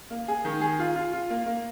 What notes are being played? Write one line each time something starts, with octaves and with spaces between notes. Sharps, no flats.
A#3
G#4
D#3
G#4
F4
F4
F4
A#3
A#3